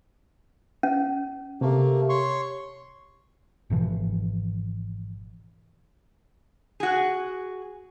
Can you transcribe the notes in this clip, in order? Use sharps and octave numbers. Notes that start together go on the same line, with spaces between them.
C#4
C3 A3 A#3 G4
C#5 C6 C#6
G#1 B2 E3 F3
F#4 G#4